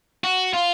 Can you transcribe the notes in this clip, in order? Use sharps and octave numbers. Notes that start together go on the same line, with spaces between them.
F#4
F4